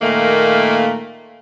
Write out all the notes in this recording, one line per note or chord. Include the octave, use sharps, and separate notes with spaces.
A#2 D#3 A3 A#3